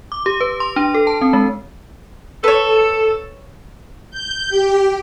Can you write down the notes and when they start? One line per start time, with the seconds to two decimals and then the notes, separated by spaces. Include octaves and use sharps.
0.12 D6
0.26 G4
0.41 B4
0.60 C6
0.76 D4
0.94 A4
1.07 A5
1.21 C4
1.33 G#3
2.44 A4 B4 C#5
4.11 G6
4.49 G4